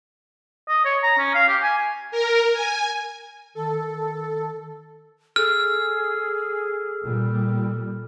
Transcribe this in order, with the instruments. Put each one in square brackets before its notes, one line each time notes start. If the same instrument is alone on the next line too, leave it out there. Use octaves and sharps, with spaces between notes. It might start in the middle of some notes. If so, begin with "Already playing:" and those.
[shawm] D#5
C#5
A#5
C#4
F5
G4
G#5
[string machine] A#4
G#5
[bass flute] D#3 [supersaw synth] A4
[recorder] G#4 [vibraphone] A4 E6 [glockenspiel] F6
[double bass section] A#2 G3